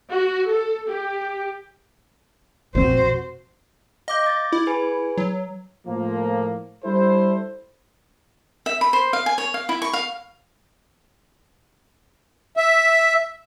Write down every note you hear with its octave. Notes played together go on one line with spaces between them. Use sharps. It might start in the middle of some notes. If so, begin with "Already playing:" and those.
F#4
A4
G4
A#1 F2 B2 C4 F#4 C5
D#5 F5 D6 G6
D6 A6
E4
G#4 B4 G#5
F#3
A2 F3 A#3
G3 D4 E4 A4 C5
E5
B5
C5
F5
G#5
C#5
F5
E4
C#6
F5
E5